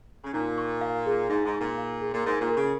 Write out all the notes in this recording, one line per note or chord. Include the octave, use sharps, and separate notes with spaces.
C#3
A#2 D#4
C#6
F5
G#4
G#2 D#4
G#2
C#6
A#2
F5
G#4
A#2
G#2 A#4
A#2
A#4
C#3